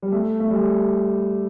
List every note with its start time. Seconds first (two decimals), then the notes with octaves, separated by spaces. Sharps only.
0.02 G3
0.12 A3
0.40 A3
0.50 G3